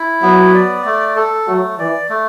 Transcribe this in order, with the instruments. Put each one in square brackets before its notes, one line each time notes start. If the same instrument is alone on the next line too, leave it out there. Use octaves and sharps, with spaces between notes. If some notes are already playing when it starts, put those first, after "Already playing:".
Already playing: [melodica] E4
[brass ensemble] F#3 [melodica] B3
[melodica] D5
A3
A4
[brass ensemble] F#3 [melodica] A3
[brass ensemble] E3 [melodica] D5
[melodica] A3